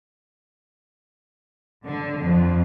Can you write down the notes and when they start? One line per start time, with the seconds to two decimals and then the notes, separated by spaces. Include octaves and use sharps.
1.86 D3
2.19 F2